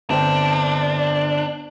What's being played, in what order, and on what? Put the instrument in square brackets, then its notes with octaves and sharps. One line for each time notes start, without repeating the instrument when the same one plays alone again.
[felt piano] G1 C4 G5 [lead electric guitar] D4